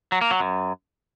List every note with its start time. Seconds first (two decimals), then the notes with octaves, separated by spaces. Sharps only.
0.12 F#3
0.21 A#3
0.31 F#3
0.40 F#2